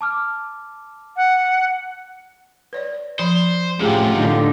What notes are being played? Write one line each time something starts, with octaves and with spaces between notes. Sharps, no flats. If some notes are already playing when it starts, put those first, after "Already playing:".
A5 D6 F6
F#5
B4 C#5 D5
F3 C5 B5
F#2 A2 C3 F4 G4 G#4
A2 D3 D#4